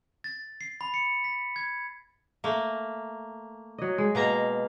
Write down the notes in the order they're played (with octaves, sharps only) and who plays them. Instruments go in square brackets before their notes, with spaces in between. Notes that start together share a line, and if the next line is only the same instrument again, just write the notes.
[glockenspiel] A6
C7
B5
C#7
B6
G#6
[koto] A3 A#3
[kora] F#3 D#5
G#3
[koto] B2 A#3 A#5